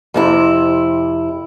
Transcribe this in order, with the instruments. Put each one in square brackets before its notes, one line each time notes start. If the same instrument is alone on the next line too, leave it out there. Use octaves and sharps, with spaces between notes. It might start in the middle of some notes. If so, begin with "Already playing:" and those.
[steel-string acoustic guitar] F2 C3 E4